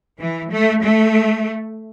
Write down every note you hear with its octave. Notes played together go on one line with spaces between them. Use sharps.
E3
A3
A3